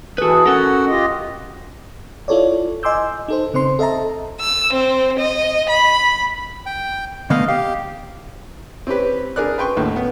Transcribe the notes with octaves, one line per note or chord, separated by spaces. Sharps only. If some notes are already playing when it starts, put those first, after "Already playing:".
E3 F#4 G#4 A4 B4
C#4 F#4 A4 A#4 F#5
F4 G4 D#5
E4 F4 A4 C#5 D5
D#5 G#5 C6 D6 E6 G6
D#4 A4 C5
C#3 C4 C5 C6
A4 D#5 E5 A5 A#5
E6
C4
D#5
B5
G5
D3 A3 B3 D#5 F5
G4 F5
C4 C#4 G4 B4
D4 G#4 A#4 D5 F#6
B4 G5 C6 C#6
D#2 A2 D3
B3